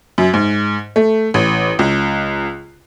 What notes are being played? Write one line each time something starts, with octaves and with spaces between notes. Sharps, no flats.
F#2
G#2
A3
A1
C#2